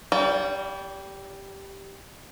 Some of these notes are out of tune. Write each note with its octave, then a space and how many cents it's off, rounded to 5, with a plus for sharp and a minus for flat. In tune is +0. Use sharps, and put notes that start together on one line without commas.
G3 +0 D5 -45